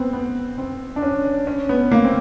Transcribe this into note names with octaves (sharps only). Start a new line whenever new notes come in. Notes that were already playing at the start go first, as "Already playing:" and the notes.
Already playing: B3 C4
B3
C4
D4
C#4
C#4
B3
A#3
C4